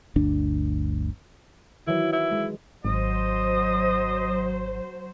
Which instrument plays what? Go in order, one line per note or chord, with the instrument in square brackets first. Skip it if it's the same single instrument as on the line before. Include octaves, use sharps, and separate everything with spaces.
[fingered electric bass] G1 D2 D4
[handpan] D#3 E3 F#3 [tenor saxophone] E4
[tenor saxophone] E4
[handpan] G#3
[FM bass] G#1 [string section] F#3 C5 [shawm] D#5